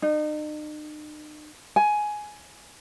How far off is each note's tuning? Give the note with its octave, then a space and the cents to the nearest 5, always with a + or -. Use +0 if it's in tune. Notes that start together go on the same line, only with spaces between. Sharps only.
D#4 -45
G#5 +10